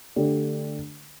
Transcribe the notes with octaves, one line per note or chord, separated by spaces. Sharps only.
D3 A3 D4 G4